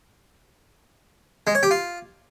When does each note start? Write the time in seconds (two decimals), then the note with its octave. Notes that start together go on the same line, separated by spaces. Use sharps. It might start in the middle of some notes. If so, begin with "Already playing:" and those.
1.47 G#3
1.55 C#5
1.63 G4
1.71 F4